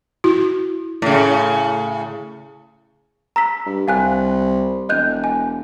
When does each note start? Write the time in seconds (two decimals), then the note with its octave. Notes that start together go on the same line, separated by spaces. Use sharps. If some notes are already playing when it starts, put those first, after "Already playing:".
0.24 E4 F#4
1.02 A2 C#3
3.36 A#5 E6 B6
3.66 G2
3.88 C2 F5 G#5 F#6
4.89 E1 D#5 F#6 G6
5.24 G#5